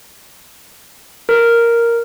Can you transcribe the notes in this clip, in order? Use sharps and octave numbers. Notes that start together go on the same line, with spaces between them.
A#4